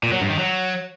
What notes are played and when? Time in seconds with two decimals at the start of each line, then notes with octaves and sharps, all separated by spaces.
0.03 A#2
0.12 F#3
0.21 G2
0.30 D#3
0.39 F#3